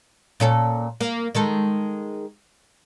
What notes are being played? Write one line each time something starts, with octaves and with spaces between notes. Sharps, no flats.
A#2 C#4 A4
A#3
D#3 G#3 A4